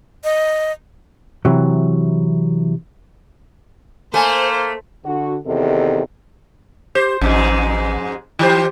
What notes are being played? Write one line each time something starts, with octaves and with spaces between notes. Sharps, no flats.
D#5
C3 E3 F#3
A3 A#3 D#4 C5 G#5 A5
D3 F#4
E2 C3 D#3 A4 D#5
G4 C5
A1 F2 G#2 G#3
E3 E4 G4 C5